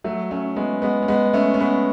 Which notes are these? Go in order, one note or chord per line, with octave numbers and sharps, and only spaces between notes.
F#3 A3
A3 C#4
G#3 B3
G#3 B3
C#4
G#3 B3
A3 C#4
C#4
G#3 B3